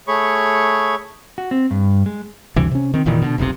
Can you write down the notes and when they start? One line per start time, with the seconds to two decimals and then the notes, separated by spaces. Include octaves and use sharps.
0.08 A3 G#4 C#5 B5 C#6
1.38 F#4
1.51 C4
1.71 G2
2.06 G#3
2.56 D2 G2 C3 E3
2.71 C3 C#4
2.94 D#3 C4
3.06 F1 A#2 D#3 E3
3.22 B2 D3
3.38 F1 B1 A2 C3